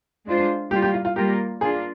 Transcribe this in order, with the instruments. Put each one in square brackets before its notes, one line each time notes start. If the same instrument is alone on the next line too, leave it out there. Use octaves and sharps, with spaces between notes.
[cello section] G#3 D4 F4 C5
[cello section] G3 A#3 F4 [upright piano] G4
[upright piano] G4
F4
F4
[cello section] G3 A#3 F4 A#4 [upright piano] G4
[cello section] A#3 D4 F4 [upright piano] G#4